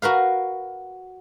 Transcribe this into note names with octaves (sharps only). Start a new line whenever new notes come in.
F#4 A#4 B4 F5